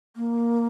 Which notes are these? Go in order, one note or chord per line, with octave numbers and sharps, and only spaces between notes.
A#3